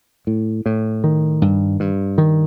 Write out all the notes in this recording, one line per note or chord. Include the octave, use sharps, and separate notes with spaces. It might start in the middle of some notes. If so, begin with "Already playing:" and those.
A2
A2
D#3
G2
G2
D#3